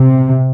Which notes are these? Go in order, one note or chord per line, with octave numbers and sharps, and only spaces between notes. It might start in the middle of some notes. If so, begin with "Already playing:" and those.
Already playing: C3